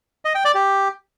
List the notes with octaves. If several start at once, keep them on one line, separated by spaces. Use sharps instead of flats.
D#5
G5
D5
G4